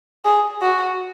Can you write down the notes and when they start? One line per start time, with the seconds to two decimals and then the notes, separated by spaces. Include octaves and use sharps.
0.25 G#4
0.61 F#4